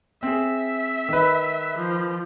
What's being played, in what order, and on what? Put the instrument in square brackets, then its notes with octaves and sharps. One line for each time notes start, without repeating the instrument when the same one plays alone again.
[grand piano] C4 G#4 [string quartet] E5
[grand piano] D#3 B4
[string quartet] F3